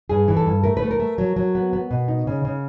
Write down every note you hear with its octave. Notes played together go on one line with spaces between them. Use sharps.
G2 G#4
E3
A4
G2
A3 A#4
B4
A3
A#4
A3
F#3
F#3
B3
B3
B2
D#4
C#3
C#3